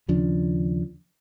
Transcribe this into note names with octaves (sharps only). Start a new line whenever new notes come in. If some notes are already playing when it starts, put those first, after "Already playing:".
D#2 C#3 F3 D4